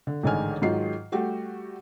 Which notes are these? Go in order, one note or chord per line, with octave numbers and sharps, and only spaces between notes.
D3
A1 G#2 D3 D#3 G#5 F6
G#2 D#3 F#3 F4 C7
G3 A3 F#4 G4